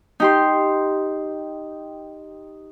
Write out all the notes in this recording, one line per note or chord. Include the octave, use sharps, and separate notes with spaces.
D#4 G4 C6